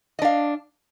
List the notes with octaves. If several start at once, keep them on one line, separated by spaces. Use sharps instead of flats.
D4 D#5 F5